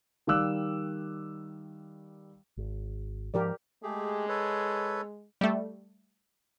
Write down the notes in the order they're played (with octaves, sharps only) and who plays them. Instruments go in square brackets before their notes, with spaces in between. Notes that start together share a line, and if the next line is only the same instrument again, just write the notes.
[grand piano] D#3 G3 F5 D6 E6 F#6
[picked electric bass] G#1
[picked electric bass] G#2 F3 [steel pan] G4 A#4 D5
[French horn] G#3 [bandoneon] A3 G4 G#4
[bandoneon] A4 B4 C#5
[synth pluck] G3 A3